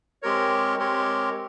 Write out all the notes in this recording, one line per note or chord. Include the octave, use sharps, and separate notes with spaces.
G#3 C4 G4 A#4 C#5
G#3 C4 G4 A#4 C#5